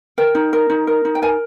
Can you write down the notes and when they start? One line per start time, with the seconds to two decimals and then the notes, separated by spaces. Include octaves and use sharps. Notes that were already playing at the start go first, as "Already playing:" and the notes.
0.18 A#4 G5
0.35 D#4
0.53 A#4
0.70 D#4
0.87 A#4
1.05 D#4
1.15 G5
1.22 A#4 G#5